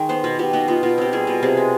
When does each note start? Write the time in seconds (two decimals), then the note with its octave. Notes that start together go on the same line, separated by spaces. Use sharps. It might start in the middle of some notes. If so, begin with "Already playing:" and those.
Already playing: D#3 G#3
0.09 B3 C5
0.24 B2 B4
0.39 B2 G4
0.53 B3 D#4
0.68 B3 F4
0.83 B2 F4
0.98 C4 G4
1.13 G3 G#4
1.27 B2
1.43 C3 G#4
1.57 G#3